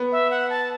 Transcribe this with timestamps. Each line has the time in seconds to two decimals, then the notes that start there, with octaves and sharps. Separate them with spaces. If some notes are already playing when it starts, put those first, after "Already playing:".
Already playing: B3
0.12 E5
0.31 F#5
0.50 A5